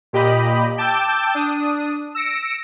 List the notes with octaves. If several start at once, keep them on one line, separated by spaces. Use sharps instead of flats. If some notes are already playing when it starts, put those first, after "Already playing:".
A#2 G4 D#5 B5
G5 A5 D6 E6 G6
D4 D#6
E6 A#6 C#7 D7